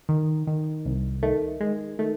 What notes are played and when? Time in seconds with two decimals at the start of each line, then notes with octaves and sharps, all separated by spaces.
0.09 D#3
0.47 D#3
0.85 C2
1.22 D#3 A3
1.60 D#3 G#3
1.99 D#3 A3